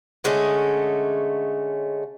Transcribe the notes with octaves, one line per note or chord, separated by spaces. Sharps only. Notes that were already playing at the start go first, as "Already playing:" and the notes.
D3 G#3 A3 C#4